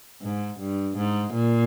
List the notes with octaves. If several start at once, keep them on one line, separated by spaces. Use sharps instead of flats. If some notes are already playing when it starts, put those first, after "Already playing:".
G#2
G2
G#2
A#2